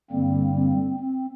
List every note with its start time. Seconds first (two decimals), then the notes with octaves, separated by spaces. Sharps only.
0.10 G2 D3 G3 A#3 C4
0.55 C4
0.99 C4